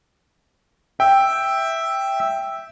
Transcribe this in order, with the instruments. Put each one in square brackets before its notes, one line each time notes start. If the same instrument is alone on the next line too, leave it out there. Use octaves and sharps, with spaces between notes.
[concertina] E5 [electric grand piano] G5